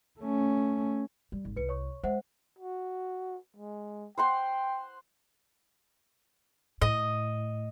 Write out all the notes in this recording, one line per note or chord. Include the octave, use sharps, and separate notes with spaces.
A3 C#4
G3
G#1
C2 B4 C#7
C#5 C#6
G#3 C5 E5 F#5
F#4
G#3
C5 F#5 G5 C6
A2 D#5